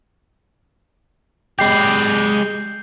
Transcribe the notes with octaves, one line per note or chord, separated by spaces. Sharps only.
G#3 G4 G6 C7